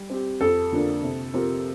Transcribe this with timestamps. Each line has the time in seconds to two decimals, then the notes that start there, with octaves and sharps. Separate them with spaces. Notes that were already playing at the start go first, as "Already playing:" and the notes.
Already playing: G3
0.10 C4 G4
0.41 F2 A4
0.72 D3 F3 A#3 D4
1.02 C3
1.34 F3 C4 G4 A#4